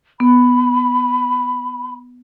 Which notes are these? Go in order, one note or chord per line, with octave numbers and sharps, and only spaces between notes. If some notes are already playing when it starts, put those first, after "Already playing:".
B3 B5